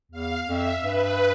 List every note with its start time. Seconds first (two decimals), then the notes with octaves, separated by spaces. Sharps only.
0.12 E2 F5
0.47 F2 E5
0.83 G2 B4